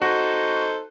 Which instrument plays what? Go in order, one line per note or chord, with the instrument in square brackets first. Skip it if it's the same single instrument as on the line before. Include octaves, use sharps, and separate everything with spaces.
[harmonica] D#4 A4 C5 [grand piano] F#4